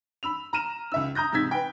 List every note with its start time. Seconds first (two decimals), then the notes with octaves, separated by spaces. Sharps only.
0.23 B5 E6 F7
0.53 A#5 F6 D#7 E7
0.92 C#2 E5 E6
1.15 A#5 D#6 G6 A#6
1.33 G#2 C3 E6 G#6 B6
1.51 B4 G5